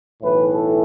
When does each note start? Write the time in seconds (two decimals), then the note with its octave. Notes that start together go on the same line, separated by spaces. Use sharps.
0.22 B1 A2 E3 B4
0.53 A4